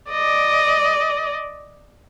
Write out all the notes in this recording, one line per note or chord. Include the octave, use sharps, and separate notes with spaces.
D5 D#5